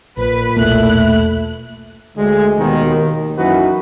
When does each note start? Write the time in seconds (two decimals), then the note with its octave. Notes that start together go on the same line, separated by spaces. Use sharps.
0.17 A#1 A#2 B4
0.57 E1 B1 A3 A#3 E4 F#6
2.16 D2 D3 G#3
2.57 D#2 B2 D#3
2.96 D#2
3.37 F#2 E3 D#4 F#4 B4